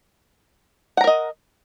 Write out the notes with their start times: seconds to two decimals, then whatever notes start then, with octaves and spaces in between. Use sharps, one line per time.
0.97 F#5
1.01 A#5
1.04 A#4
1.07 D#5